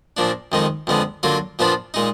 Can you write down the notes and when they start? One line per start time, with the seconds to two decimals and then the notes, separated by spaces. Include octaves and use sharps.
0.17 A#2 F3 A#3 D4
0.52 F2 D#3 G#3 D#4
0.87 F2 D3 G#3 B3
1.23 D3 F#3 A#3 F4
1.59 A#2 F3 B3 D4 F4
1.94 A#2 G#3 D#4